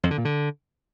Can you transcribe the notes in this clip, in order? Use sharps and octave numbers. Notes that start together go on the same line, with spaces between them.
F2
D3
A#2
D3